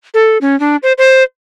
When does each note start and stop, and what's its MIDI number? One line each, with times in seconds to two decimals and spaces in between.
0.14 0.38 69
0.41 0.58 61
0.60 0.76 62
0.83 0.93 72
0.98 1.23 72